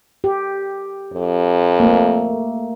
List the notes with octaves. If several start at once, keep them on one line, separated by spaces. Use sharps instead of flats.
G4
F2
A3 A#3